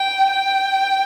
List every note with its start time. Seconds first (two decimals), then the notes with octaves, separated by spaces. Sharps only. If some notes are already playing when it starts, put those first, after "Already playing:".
Already playing: G5
0.31 G5